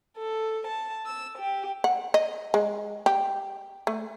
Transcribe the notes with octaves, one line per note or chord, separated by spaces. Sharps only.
A4
A5
E6
G4
F#5
D#5
G#3
G4
A3